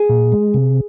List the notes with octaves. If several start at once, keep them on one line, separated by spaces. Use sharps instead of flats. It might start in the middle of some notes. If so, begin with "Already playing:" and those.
Already playing: G#4
A#2
G#3
C3